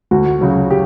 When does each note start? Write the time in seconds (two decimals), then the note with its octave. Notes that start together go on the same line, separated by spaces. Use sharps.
0.11 D2 F#4
0.41 C#3 F#3
0.70 G4